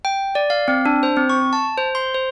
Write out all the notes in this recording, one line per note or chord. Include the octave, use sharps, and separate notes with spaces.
G5
D5
F5
C4
D4
C5
C4
C#6
A5
C5
C6
C5